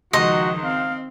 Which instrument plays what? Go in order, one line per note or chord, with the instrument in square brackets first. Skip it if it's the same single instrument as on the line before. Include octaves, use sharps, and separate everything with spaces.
[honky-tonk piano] C#2 C6 [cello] D#3 F3 [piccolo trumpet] F#4 [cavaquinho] D#5
[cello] C4 [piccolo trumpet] F5